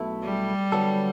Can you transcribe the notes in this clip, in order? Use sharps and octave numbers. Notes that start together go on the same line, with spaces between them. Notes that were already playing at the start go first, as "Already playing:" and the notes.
Already playing: B1 B2 A3 E4
G3
D3 F#3 B3 D4 A4